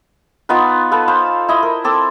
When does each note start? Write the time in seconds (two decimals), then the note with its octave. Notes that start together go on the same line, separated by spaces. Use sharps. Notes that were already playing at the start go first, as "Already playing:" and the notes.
0.49 B3 D#4 F4 B4
0.91 A4 B4 F5 B5
1.08 C5 F5 B5
1.49 E4 D#5
1.63 A#4
1.84 C4 A4 D6 E6